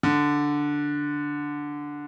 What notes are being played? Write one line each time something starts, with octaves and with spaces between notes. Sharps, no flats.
D3